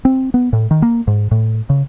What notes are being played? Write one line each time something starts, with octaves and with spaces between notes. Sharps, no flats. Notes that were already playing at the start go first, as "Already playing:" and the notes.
C4
B3
A2
D#3
A#3
G#2
A2
C#3